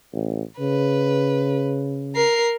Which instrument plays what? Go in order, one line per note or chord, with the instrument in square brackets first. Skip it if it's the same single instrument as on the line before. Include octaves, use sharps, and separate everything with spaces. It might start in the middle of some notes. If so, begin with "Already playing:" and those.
[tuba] A1
[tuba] C#3 [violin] B4
[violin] A#4 C7